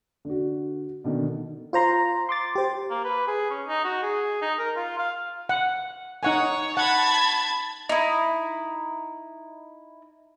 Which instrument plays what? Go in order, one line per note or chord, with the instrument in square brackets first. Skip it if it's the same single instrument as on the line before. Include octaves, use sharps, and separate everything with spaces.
[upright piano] D3 F#4
B2 D3 D#3
[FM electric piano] F4 C5 A#5 C6
C6 D6 A6
G4 C5
[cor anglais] A#3
B4
G#4
C#4
D#4
F#4
G#4
D#4
A#4
F4
F5
[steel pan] F#5
[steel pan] D#4 F#5 G#5 [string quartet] C#5
[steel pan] F#5 [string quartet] A5 B5 G#6
[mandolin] D#4 E4